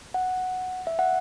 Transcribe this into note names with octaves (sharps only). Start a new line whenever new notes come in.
F#5
E5
F#5